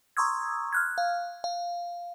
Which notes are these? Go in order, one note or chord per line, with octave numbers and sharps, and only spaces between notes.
A#5 C6 C#6 D#6 E6 G#6
F6 F#6 G#6
F5
F5